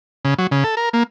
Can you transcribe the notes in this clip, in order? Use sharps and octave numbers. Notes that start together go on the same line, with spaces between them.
C#3
F#3
C#3
A4
A#4
A#3